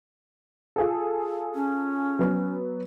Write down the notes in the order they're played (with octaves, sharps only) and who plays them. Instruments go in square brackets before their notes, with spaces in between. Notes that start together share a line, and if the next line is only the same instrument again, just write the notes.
[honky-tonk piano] F4 G#4 A4
[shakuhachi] C#4
[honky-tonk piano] F#3 B3